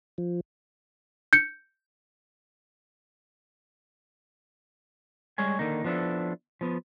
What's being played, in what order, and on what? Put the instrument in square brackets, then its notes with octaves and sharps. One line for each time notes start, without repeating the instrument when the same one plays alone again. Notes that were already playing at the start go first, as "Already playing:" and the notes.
[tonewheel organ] F3
[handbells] G6 C#7
[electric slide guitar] G3 G#3 C#5 G#5
D3 D#3 A#3 D#4
F3 B3 D4 E4 A4
F3 B3